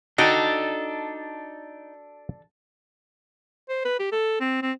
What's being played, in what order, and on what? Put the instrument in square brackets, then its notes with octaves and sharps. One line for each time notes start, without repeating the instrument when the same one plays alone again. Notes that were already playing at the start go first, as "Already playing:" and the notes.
[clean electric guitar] D4 A4 [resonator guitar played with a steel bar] D#4 [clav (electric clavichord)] F#4 D5 G5
[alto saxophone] C5
B4
G4
A4
C4
C4